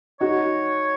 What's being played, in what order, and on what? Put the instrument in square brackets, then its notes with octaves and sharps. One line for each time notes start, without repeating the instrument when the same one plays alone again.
[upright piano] D#4 F#4 [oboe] C#5